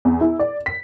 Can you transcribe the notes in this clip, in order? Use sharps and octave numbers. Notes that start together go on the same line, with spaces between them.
E2
E4
D5
B6